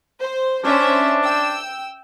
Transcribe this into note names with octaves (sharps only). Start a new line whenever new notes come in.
C5
C#4 D4 C5 E5
G5 E6